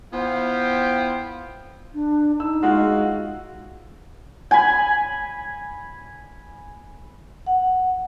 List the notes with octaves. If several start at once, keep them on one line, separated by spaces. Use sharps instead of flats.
B3 E4 F4 C5 F5 G5
D4
D#4 E6
G#3 F4 F#4
G#5 B5
F#5